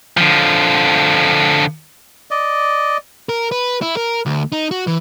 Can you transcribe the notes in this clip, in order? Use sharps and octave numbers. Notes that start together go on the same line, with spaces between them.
D3 F3
D5 D#5
A#4
B4
E4
A#4
D2
D#4
F#4
E3